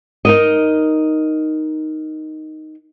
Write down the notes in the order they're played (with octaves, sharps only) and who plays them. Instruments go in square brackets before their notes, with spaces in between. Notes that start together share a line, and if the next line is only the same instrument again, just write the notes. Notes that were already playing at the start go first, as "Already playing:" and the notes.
[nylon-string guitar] D#4 A#4 D#5